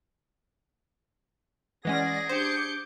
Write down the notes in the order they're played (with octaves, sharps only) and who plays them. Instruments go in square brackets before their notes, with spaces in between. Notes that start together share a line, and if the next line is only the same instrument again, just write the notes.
[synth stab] E3 G#3 C#4 [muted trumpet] G#4 [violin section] D5 A#6 [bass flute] F#5
[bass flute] D4 [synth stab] G4 C5 [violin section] D6 G6 C#7